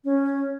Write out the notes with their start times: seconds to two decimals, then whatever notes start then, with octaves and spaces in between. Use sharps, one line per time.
0.05 C#4